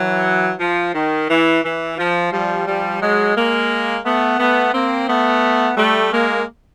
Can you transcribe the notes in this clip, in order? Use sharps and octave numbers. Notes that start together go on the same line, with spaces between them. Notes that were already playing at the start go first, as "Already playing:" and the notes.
Already playing: E3 F#3
F3
D#3
E3
E3
F3
F3 G3
F3 G3
F#3 G#3
G#3 A#3
A3 B3
A3 B3
A#3 C4
A3 B3
G3 A3
G#3 A#3